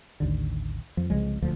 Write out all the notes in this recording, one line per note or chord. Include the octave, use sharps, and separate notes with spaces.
A1 D#2 D3
F2 F3
C2 C#3 F3 G#3
D#1 D2 F3